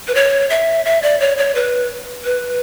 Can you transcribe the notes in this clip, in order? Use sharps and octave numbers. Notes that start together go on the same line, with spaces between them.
B4
C#5
E5
E5
D5
C#5
C#5
B4
B4